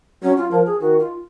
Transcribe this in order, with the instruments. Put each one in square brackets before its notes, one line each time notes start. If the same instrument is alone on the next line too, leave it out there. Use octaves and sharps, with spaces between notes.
[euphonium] F#3 [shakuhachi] C#4
[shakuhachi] F4
[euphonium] F3 [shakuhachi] A#4
[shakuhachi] G#4
[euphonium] D#3 [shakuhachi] F#4
[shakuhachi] F4